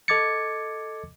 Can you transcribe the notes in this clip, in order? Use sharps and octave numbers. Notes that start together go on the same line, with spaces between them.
A4 D#5 D6 G#6 A6 C#7